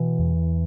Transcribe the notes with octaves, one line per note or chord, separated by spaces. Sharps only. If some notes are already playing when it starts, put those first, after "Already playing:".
Already playing: B2 E3
E2